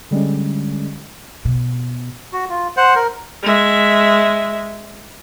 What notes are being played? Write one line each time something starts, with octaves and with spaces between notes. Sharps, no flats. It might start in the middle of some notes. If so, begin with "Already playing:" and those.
D3 G3 G#3 C#4
B2
F#4
F4
C5 F#5
A#4
G#3 E5